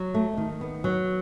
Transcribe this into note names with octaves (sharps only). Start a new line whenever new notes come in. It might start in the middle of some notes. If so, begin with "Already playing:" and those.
Already playing: F#3
A3
D#3
B3
F#3